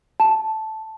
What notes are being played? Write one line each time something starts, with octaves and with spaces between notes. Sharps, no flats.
A5